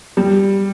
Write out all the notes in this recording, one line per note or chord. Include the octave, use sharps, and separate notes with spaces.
G3